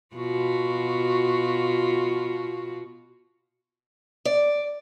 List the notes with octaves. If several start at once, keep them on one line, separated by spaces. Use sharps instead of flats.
B2 F4 F#4
D5